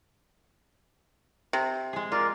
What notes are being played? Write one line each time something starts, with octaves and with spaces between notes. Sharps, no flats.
C3
G#3 G#4
F4 A#4 D5